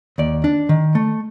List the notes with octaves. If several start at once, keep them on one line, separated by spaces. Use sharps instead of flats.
D#2 D5
D4
D#3
A3